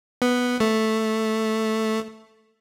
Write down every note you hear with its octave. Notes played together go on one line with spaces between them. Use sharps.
B3
A3